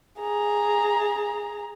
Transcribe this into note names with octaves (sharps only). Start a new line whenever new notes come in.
G#4 A#5